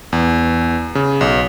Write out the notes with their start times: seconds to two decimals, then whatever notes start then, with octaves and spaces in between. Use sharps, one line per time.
0.13 E2
0.95 C#3
1.21 B1